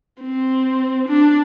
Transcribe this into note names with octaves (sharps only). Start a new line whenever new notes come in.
C4
D4